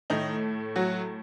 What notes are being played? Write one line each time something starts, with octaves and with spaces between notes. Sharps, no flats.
A2 D#3 A3 D#4
F#3 F#4